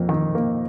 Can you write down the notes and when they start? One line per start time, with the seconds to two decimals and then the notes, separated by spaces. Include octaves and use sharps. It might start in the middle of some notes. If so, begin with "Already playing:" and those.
Already playing: F2 A#3
0.09 D#3
0.35 A#3